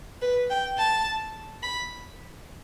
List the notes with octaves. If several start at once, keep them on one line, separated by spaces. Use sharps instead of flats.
B4
G5
A5
B5